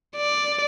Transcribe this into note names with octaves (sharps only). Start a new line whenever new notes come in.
D5